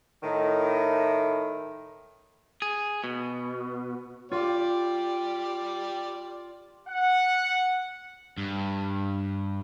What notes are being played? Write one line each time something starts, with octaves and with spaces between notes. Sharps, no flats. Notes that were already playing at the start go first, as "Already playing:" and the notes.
A2 D#3
G#4
B2
F4 G4 D5
F#5
G2